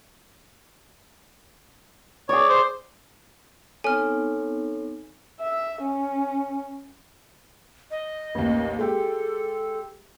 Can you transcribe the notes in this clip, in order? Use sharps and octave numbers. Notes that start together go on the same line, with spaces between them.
G#4 C#5 D5
C5
B3 C4 D#4 A4 C#5 G#5 F6
E5
C#4
D#5
A1 D#2
G#3 G4 A4